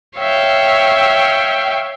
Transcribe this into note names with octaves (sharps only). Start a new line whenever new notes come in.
C#5 E5 F5 G5